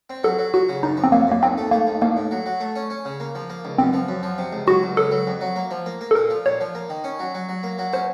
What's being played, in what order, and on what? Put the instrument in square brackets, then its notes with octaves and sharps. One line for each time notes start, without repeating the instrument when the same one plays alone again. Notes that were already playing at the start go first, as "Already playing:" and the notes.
[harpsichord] C4
[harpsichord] F#3 [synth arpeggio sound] A4
[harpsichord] F#3
[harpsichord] F#3 [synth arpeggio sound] F#4
[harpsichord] C#3
[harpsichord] F#2 [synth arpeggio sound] D#4
[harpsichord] F3
[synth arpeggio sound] C4
[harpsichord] F#2 [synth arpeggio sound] A#3
[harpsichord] F#2 [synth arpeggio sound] A#3
[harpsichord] D#2 [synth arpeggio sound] C4
[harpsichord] A3
[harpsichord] A3 [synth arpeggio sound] A#3
[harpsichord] D#2
[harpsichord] A1 [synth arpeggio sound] A#3
[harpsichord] A2
F#3
F#3
A3
C#4
C#4
C#3
A#3
F3
A#3
C#2
[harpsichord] F#2 [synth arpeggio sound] C4
[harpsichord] F3
F#2
F3
C3
C#2
[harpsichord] F#3 [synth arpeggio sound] F#4
[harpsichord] C#2
[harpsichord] C#3 [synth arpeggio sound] A4
[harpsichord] F#3
F2
F#3
A#3
F3
A#3
A#3
[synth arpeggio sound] A4
[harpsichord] A#2 [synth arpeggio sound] A#4
[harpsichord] F3
[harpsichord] A#2 [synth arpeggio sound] C#5
[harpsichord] F3
A#3
D#3
C#4
F#3
F#3
F#3
A#3
F#3
[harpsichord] C#4 [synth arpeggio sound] C5